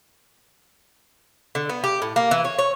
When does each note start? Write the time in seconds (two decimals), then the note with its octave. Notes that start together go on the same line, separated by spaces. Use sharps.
1.55 D3
1.69 B3
1.84 G4
2.02 A2
2.16 A#3
2.31 E3
2.44 C#5
2.59 C#5